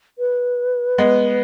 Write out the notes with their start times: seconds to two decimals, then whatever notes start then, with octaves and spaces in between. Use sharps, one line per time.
0.19 B4
0.98 G#3 B3